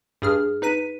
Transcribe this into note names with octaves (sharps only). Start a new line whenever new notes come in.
G2 G#4 F6
D#4 B4 B6 D#7